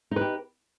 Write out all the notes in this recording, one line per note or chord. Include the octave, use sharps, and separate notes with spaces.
D#4 G4 B4